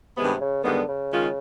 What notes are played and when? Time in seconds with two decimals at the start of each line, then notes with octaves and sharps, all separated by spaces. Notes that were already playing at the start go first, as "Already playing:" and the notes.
0.17 G2 C3 D#3 G#3 B3
0.41 C#3
0.64 G2 D3 D#3 G#3 B3
0.88 C#3
1.11 D#3 G#3 C#4 F4